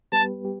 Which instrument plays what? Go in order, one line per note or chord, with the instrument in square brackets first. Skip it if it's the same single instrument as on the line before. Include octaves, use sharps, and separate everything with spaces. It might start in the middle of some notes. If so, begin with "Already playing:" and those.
[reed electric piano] G3 B3 G4 B4 [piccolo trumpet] A5
[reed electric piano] G3 G4